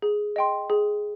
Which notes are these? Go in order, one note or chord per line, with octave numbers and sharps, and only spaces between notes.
G#4
D#5 G5 C6
G#4